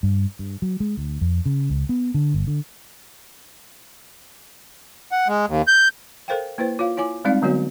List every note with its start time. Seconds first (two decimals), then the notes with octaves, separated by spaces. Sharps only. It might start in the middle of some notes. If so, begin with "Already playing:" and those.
0.03 G2
0.39 G2
0.62 F#3
0.80 G#3
0.97 D2
1.21 F2
1.46 C#3
1.70 C#2
1.89 B3
2.14 D3
2.34 G1
2.47 D3
5.12 F#5
5.28 G#3
5.47 D#2
5.67 G6
6.28 A4 A#4 C5 F5 G5
6.58 A#3 E4 B4 C5
6.79 F4 C#5 F5
6.97 E4 C#5 G#5 D6
7.25 G3 G#3 C4 D#4 D5 F5
7.42 D3 F#3 B3 F#4 C#5